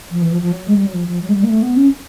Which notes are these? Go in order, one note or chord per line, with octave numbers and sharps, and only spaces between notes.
F3
E3
F3
F3
F#3
G#3
G3
F#3
F3
F3
F#3
G#3
G3
A#3
A3
B3
C#4